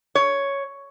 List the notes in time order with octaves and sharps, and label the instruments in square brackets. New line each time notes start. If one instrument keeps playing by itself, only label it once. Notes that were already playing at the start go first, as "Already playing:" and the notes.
[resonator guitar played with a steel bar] C#5